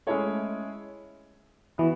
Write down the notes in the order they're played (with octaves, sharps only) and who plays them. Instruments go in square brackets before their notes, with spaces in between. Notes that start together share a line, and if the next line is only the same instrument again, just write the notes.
[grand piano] G#3 C#4 E4 G#4 C#5 [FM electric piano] A3
[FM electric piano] E3 [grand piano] B3 F#4